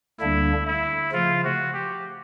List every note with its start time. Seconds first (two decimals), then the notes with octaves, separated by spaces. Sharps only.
0.20 D2 D3 G3 A#3 D4 E4
0.67 E4
1.13 C#3 F3 A3 F4
1.44 F#4
1.73 G4